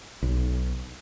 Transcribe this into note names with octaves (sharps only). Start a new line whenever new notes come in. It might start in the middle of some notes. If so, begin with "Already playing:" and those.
B1